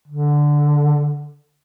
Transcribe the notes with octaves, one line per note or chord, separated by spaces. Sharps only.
D3